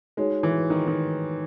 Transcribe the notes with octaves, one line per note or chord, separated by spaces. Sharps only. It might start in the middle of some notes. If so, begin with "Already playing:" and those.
G#3 D#4 F#4 C#5
E3
D#3
D#3